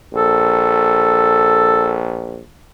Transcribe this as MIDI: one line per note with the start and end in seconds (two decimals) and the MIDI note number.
0.14 2.40 34
0.14 1.99 69